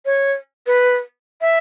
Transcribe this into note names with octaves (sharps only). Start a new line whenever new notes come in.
C#5
B4
E5